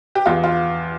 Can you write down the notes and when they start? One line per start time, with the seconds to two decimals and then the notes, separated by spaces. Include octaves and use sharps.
0.15 G4
0.26 E2 F4
0.44 F4